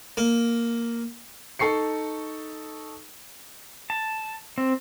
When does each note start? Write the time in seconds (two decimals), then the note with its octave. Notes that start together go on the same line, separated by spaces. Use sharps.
0.17 A#3
1.59 D#4 A4 C#6 C7 C#7
3.90 A5
4.58 C4